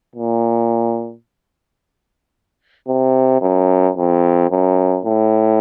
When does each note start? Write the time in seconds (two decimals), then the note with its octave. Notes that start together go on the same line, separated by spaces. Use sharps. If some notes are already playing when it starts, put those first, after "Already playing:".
0.16 A#2
2.88 C3
3.41 F#2
3.97 F2
4.51 F#2
5.05 A2